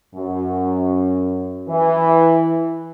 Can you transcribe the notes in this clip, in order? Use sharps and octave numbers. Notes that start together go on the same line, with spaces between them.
F#2
E3